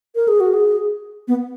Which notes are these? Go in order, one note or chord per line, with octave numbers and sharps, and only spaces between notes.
A#4
G#4
F#4
G#4
B3